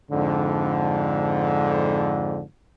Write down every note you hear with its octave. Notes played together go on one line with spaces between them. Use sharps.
F2 G#2 D3